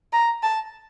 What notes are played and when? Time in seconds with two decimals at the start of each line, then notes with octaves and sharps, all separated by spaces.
0.13 A#5
0.43 A5